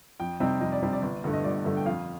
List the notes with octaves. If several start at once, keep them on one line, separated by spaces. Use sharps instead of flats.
F2 G5
C3 G3 C4 D#4
F2 D#5
D5
C3 G3 C4 D#4
D5
G1
G2 D3 A3
D#5
G1 D5
G2 D3 A3
G5
F2 F5